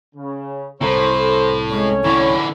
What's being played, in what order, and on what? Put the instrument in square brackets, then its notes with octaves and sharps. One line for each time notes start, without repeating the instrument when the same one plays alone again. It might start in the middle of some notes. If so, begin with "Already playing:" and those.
[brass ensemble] C#3
[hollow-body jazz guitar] C2 [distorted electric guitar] A2 [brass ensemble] A4 C5
[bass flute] G#3 [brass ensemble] A3 C#4 C#5
[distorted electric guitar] D3 E3 [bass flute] E4